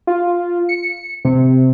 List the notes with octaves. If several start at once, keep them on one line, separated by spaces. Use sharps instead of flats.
F4
C#7
C3